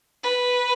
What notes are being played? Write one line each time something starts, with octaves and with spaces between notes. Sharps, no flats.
B4